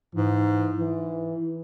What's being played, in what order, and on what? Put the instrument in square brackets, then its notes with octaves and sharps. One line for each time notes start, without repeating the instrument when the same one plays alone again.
[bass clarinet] G#2 [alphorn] E3
[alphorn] E3